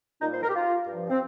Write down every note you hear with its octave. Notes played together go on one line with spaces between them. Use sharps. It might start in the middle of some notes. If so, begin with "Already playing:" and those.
A#2 G3 D#4
C5
A#4
G4
F4
G2 F3
C4